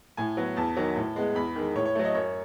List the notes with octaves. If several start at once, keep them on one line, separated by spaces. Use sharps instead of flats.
A2 G#5
F#3 B3
E2 A5
D#3 F#3
A2
G#3 B3
E2 B5
D#3 G#3
A2 C#5
C#5
F#3 A3
D#5
F#2 C#5